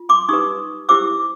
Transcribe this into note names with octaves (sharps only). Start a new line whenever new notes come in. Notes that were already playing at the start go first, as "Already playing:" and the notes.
Already playing: F4
C6 D6
D#4 G4 B4 C#6 D#6
E4 G4 C5 D6 E6